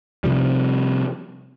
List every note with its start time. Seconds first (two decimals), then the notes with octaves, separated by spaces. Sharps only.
0.24 C3 F3 G3